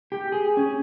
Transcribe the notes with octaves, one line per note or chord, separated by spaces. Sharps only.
G4
G#4
C#4